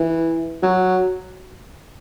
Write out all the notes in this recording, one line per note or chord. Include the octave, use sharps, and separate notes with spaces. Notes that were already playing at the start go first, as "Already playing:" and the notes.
Already playing: E3
F#3